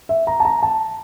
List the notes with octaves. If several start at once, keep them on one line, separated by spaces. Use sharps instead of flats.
E5
A#5
A5
A#5
A5